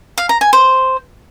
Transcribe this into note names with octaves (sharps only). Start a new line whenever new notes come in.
F5
A#5
G#5
C5